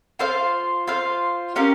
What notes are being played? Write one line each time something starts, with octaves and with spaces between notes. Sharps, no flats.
F4 C5 F5
F4 C5 F5
C#4 G4 A#4 F5